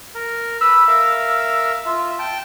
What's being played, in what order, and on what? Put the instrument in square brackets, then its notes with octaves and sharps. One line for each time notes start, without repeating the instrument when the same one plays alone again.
[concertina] A#4
[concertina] B4 B5 [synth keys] E6
[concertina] A#4 E5 F5
F4 E5
G5 A5